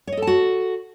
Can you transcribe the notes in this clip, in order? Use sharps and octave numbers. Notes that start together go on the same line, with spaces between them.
F#4 A4 C#5 D#5 A5